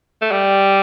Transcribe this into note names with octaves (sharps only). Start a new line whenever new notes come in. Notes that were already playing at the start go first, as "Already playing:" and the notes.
A3
G3